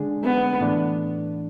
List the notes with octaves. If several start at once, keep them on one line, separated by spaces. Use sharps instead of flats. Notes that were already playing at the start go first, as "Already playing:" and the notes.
Already playing: D3 G#3 D4 G#4
B3
A2 E3 A3 D4